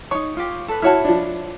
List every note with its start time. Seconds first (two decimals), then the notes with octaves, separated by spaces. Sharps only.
0.11 D4 D#4 C#5
0.37 F4 G4
0.68 A4 B4
0.82 E4 F#4 C#5 A5 F6
1.05 F3 D4